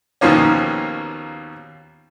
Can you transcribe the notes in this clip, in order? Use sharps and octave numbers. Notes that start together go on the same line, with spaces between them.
D#2 B2 D#3 F3 A#3 C#4